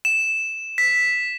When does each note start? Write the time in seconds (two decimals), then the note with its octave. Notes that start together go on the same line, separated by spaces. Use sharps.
0.05 E7
0.78 B6